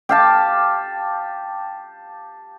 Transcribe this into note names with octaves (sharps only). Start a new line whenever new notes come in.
G4 F5 A5